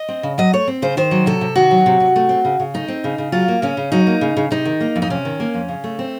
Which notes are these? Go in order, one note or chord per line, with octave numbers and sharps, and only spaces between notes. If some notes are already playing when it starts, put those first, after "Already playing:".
Already playing: D#5
C4
C#3
F#3 D#5
A3 C#5
C4
C#3 C5
D#3 C5
F#3
C3 A4
C3
D#3 F#4
F#3
C3
C3
A3
C4
C#3
C#3
A3 D#4
C4
C#3
C#3
F#3 F4
A#3
C#3 C#4
C#3
F#3 D#4
A#3
C#3
C#3
C3 D#4
D#3
A#3
F2
D#4
C3 C#4
D#3
A#3
F2
C#3
A3
C4